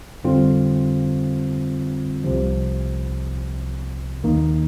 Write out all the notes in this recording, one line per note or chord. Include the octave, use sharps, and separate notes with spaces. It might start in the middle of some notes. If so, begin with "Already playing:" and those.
F2 D3 G3 C4 F4
C2 C3 F3
D#2 D#3 A#3 D#4